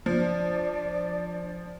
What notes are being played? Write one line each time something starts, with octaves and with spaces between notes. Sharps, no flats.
F3 D4 D5